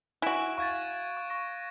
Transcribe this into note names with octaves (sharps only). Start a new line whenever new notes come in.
E4 F#4 G#5 F#6 D7 E7
F5 C#6 G#6 A6
C#6
C#6 A#6